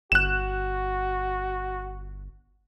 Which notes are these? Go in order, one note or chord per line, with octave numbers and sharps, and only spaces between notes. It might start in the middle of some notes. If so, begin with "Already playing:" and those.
G1 F#4 F#6 E7